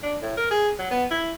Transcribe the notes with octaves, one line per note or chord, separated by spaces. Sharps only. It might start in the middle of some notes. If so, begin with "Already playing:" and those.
D4
A2
A#4
G#4
F#3
B3
E4